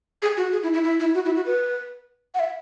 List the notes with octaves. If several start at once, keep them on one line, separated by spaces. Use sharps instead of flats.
G#4
F#4
G#4
E4
E4
E4
E4
F#4
E4
F#4
B4
F#5
E5